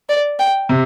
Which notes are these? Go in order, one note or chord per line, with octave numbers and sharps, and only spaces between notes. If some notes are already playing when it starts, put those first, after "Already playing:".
D5
G5
C3